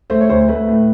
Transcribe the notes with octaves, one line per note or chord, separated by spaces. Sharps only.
A3 C5
C#5
D2 C5
A3 B4
A2